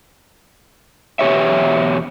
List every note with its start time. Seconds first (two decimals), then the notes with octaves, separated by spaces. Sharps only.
1.19 E2 B2 G4 C#5 E5